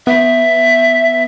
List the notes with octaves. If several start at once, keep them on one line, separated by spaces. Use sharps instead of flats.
B3 E5